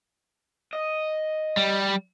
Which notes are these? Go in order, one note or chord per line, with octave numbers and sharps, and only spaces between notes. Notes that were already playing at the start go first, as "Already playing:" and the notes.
D#5
G3